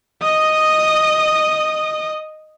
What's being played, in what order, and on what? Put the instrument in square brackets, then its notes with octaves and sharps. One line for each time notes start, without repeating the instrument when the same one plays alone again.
[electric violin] D#5 D#6